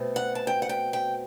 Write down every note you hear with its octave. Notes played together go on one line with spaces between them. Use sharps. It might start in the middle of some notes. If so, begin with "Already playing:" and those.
Already playing: B2 A3 C4
F#5
A5
G5
F#5
G5
G5